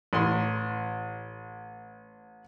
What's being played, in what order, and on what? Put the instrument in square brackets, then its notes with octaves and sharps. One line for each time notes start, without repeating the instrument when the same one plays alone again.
[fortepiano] A1 C6